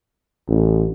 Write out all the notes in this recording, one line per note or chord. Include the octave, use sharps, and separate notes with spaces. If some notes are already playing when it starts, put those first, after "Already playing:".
A1